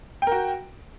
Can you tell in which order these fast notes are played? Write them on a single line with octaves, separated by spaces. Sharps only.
G5 A#4 F#4